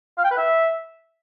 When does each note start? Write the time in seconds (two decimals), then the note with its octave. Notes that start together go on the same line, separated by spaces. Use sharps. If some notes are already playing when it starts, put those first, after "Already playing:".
0.18 F5
0.24 G5
0.31 B4
0.37 E5